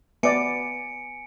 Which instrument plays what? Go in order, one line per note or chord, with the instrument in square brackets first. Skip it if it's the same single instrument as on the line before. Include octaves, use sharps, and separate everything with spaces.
[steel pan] B3 D5 [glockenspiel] G#5 C#7 D7